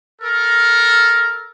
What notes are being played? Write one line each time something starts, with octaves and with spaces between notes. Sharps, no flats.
A4 A#4